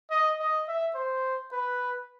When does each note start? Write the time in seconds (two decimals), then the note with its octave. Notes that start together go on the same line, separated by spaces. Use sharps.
0.11 D#5
0.40 D#5
0.68 E5
0.95 C5
1.52 B4